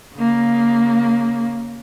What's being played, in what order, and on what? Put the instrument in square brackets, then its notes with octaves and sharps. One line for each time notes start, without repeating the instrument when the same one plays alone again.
[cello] C#3 A#3